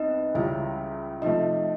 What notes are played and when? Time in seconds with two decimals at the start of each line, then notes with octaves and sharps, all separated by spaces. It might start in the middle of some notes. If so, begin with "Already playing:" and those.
Already playing: C2 B3 D#4 D#5
0.34 C#2 C#3 E3 G3 E4 E5
1.22 C3 F3 A3 D#4 D#5